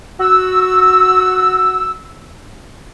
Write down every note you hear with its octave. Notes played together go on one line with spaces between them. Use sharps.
F#4 E6